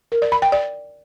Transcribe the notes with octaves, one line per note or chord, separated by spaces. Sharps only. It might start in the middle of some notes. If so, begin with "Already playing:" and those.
A#4
D5
B5
G5
D5